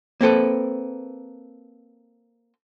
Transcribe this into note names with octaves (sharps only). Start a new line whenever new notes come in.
A#3 C4 A4 B4